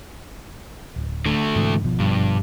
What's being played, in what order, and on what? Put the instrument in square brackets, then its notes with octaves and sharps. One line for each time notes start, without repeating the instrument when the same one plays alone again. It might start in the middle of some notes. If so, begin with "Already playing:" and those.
[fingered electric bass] D1
[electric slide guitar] D3 A3
[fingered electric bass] G#2 C3 E3
G#1 B2 F3
[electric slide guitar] G2